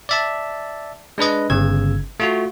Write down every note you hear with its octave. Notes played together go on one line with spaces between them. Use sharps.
D5 E5 A5
G#3 D4 B4 D#5
G1 C#3 E6 G#6
A3 F4 F#4